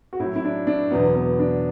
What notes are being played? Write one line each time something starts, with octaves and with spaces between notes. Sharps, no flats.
F#4
A2 F#3 E4
E4
D4
D4
E2 B2 F#3 B3
B3
D4